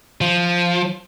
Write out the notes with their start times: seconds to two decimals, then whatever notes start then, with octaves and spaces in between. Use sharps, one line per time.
0.21 F3